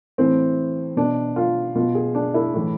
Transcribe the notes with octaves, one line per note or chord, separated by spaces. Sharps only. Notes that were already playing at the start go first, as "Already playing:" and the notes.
A2 E3 C4
B2 D4
F4
B2 F4
G#4
D4
E4
A2 E3